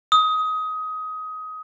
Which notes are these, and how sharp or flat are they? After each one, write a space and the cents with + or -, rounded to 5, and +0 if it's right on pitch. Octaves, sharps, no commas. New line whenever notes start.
D#6 +20